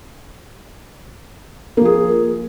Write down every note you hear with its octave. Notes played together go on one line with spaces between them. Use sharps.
F3 A#3 G#4